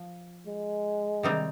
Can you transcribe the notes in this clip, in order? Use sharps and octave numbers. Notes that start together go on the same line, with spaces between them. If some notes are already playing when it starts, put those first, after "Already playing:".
Already playing: F3
G#3
C3 D#3 G3 C4 D#4